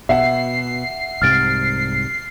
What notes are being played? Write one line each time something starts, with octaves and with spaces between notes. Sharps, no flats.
B2 E5 F#5 C7
C2 G#2 C3 F6 A6 D7